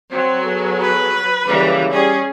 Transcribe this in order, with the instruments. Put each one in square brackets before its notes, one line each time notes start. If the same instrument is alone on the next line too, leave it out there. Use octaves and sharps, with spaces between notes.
[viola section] F#3 [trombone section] C4 C5
[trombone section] B3 G#4 A4
[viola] B4
[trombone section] C#3 F#3 A#3 [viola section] E3 G3
[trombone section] G3 [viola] C#4 [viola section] G#4